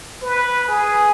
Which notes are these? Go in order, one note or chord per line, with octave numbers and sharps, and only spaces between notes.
B4
G#4